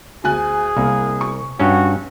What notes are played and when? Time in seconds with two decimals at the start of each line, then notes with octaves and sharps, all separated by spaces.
0.24 D2 G#4 G#5 F#6
0.77 C2 A#3
1.21 C#6
1.60 G2 C#4 F#4